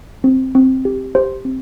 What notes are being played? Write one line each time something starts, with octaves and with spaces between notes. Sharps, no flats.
C4
C4
G4
G4 C5
C4